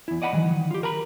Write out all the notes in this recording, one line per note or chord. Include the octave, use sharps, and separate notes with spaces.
E2 E4
D5 D#5 F#5 A#5 B5
D#3 E3 F#3
D#3
F4 G4
A#4 A#5 B5